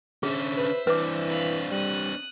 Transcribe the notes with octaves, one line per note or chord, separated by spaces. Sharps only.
D3 C#4 G#4 C5 E5
B4
E3 C4 D4 B4 D6
F5 B5
G3 D#6 F#6